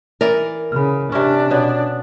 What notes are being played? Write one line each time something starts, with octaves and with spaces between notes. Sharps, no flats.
E3 A#4 D5
C#3 B5 F6
C3 C#4 D4
B2 B3 C#5 D5